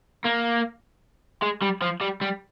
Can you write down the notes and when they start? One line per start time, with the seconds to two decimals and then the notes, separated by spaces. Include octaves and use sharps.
0.24 A#3
1.42 G#3
1.62 G3
1.82 F3
2.01 G3
2.21 G3